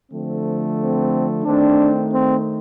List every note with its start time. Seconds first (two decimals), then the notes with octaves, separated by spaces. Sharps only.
0.11 D3 F3 A3 C4
0.78 C4
1.45 D#3 A3 C4 D4
2.12 C4